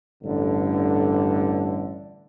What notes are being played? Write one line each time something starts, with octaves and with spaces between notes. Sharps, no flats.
A1 G2 D3